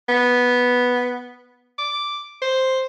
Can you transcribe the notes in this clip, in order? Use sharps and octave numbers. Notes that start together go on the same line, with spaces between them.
B3
D6
C5